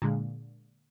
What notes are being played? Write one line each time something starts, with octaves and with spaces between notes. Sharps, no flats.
A#2 D3 G#3